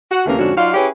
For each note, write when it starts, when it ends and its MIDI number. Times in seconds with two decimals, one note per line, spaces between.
0.11 0.25 66
0.26 0.37 38
0.26 0.37 48
0.26 0.37 52
0.26 0.37 57
0.26 0.37 58
0.26 0.37 61
0.38 0.51 41
0.38 0.51 44
0.38 0.51 50
0.38 0.51 61
0.38 0.51 62
0.38 0.51 66
0.56 0.71 54
0.56 0.71 63
0.56 0.71 65
0.56 0.71 66
0.56 0.71 74
0.56 0.71 77
0.74 0.87 61
0.74 0.87 64
0.74 0.87 67
0.74 0.87 68
0.74 0.87 71
0.74 0.87 73